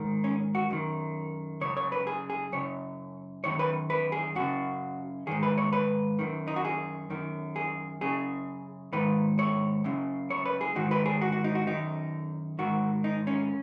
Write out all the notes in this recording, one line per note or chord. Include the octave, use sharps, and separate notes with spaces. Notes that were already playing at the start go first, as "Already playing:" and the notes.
Already playing: G#2 D#3
C#4
F#4
F#2 D#3
F#2 C#3 C#5
C#5
B4
G#4
G#4
F#2 C#3 C#5
F#2 D#3 C#5
B4
B4
G#4
F#2 C#3 F#4
G#2 D#3 G#4
B4
C#5
B4
F#2 D#3
D#4
F#4
G#4
F#2 D#3
G#4
F#2 C#3 G#4
G#2 D#3 B4
C#5
F#2 C#3
C#5
B4
G#4
G#2 D#3 F#4
B4
G#4
F#4
F#4
D#4
F#4
F#2 D#3 D#4
G#2 D#3 F#4
D#4
C#4